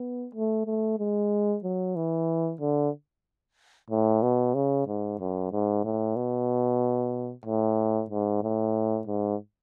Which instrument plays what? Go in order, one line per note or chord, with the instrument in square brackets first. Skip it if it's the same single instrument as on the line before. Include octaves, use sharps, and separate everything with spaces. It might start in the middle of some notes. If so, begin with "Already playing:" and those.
Already playing: [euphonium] B3
A3
A3
G#3
F#3
E3
D3
A2
B2
C#3
G#2
F#2
G#2
A2
B2
A2
G#2
A2
G#2